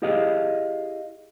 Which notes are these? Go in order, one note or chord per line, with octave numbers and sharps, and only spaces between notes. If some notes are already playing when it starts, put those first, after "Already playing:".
E4 G4 G#4 D#5 F5